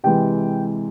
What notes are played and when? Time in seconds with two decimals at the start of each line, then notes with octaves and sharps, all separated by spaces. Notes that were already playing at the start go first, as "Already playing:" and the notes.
0.04 C3 E3 G#3 G5